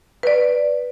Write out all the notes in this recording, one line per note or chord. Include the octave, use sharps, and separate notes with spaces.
B4 D5